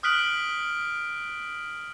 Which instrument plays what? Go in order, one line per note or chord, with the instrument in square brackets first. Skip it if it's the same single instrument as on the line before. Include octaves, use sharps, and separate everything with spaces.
[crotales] D#6 F6 F#6 B6 D7 F#7